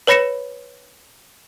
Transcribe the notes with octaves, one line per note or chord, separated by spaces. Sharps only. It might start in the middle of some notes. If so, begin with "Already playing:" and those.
B4 C#5 B5 A#6 C#7 E7